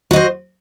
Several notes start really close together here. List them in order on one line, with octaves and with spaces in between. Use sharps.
F#4 D#5 C5